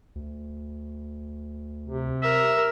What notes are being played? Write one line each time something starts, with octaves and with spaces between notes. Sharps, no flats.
D2
C3
A#4 E5